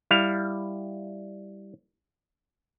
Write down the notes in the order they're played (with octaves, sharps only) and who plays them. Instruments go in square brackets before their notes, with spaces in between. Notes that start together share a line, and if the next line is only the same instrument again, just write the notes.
[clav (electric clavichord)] G3 E4 F5